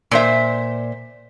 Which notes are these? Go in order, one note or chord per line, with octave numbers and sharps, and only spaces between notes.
A#2 C5 E5